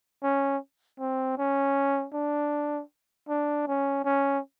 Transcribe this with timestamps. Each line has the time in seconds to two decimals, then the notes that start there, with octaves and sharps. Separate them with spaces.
0.23 C#4
1.00 C4
1.38 C#4
2.14 D4
3.29 D4
3.67 C#4
4.05 C#4